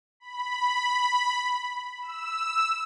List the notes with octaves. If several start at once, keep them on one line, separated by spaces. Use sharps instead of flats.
B5
E6